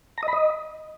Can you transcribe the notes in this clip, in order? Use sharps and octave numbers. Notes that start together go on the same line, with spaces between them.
A#5
D#5
B5
D#5